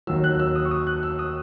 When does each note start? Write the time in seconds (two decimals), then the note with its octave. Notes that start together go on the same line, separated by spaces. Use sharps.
0.07 D#2 D#3 F#3 E6
0.24 F#6
0.40 E6
0.55 D#6
0.65 C#6
0.71 D#6
0.87 F#6
1.03 E6
1.19 D#6